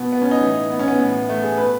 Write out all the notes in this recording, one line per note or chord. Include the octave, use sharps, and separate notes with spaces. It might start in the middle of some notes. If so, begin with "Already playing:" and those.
Already playing: B2 B3
B3
C#4
D#4
A2 E3
B3
C#4
B3
A2
E3
A3
G#4
B2 B4